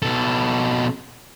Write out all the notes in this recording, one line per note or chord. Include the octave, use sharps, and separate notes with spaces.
B2 A4